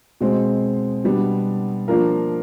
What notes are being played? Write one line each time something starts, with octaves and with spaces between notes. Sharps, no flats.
B2 G#3 C4
B2 G3 B3 D4
F3 A#3 D4 F4 A#4